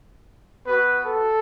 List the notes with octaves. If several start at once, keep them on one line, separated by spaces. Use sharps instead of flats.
B3 F#4 B4
A4